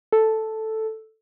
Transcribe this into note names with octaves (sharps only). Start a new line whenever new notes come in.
A4